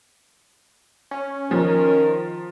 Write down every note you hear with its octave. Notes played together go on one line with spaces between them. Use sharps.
C#4
D#3 F3 A#4